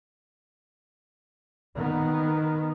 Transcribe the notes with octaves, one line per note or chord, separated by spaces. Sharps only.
D#3 B3